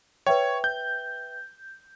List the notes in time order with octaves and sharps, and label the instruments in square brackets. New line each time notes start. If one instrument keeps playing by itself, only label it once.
[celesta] B4 E5 G5 [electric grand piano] C#5
[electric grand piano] G6